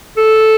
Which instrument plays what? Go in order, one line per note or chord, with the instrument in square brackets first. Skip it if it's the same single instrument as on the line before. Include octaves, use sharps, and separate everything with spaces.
[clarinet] A4